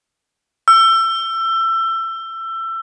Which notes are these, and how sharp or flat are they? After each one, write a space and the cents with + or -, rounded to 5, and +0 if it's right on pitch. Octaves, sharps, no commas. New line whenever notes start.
E6 +25